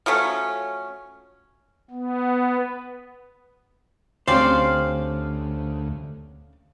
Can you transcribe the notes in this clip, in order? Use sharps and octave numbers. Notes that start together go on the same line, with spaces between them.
F3 F#3 A3 C#4
B3
D2 C4 C#4 G4 C5 D5 F5